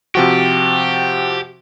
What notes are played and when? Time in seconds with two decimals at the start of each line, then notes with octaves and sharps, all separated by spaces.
0.15 C3 F3 F#4 G4